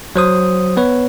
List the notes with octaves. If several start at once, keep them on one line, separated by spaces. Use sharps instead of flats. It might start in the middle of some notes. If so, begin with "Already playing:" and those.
F#3 C5 D#6
B3 B4 C#5